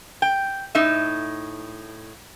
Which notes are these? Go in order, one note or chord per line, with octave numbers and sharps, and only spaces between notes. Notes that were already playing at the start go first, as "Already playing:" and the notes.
G5
A2 D#4 E5